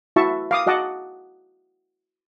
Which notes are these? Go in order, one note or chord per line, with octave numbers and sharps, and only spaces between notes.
E4 F#4 E5 A5 C#6
F5 D6 D#6
F#4 D#5 F#5 A5 D6